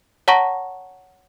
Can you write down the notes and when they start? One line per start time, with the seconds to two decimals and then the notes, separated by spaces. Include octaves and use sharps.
0.28 C#5 F#5 A5 A#5 C#6 A#6